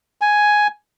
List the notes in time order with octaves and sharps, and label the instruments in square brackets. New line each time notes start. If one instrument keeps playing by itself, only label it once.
[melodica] G#5